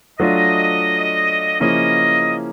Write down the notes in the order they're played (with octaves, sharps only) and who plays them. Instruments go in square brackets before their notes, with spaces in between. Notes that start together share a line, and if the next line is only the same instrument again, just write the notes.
[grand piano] F#3 A3 D4 F4 [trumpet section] D#5
[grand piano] C#3 F3 A#3 C#4 E4 [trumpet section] D#5